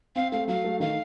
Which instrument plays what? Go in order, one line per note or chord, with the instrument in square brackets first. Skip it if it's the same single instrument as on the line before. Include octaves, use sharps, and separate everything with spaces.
[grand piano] C4 [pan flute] F5
[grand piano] A3 [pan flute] F5
[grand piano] F#3 [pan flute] F5
[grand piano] A3
[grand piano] D#3 [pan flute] F5